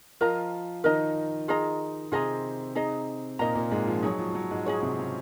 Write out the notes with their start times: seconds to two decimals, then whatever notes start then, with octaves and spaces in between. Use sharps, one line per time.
0.21 F3 F4 A#4 D#5 A#5
0.84 D#3 D#4 A#4 D#5 A#5
1.48 F4 G#4 D#5 A#5
2.12 C3 C4 F4 G#4 D#5 A#5
2.75 D#4 G#4 D#5 A#5
3.39 A#2 A#3 D#4 G#4 D#5 A#5
3.55 A#2 A#3
3.71 G#2 G#3
3.87 F3
4.02 F#3 D#4 G#4 C#5
4.19 F3
4.30 F3
4.35 F#3
4.51 G#2 G#3
4.66 D#4 G#4 C#5
4.82 C3 C4
4.98 C#3 C#4